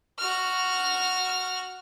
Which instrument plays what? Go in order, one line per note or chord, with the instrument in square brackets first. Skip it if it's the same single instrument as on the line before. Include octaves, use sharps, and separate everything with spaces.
[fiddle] F#4 F6